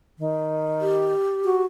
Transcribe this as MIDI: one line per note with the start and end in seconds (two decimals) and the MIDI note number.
0.19 1.14 51
0.81 1.62 67
1.45 1.65 66